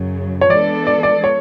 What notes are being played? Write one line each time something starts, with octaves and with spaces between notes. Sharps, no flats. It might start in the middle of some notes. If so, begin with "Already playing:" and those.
Already playing: F#2 C#3 F#3
C#5
E3 G#3 B3 D4 A4 D5
D5
D5
C#5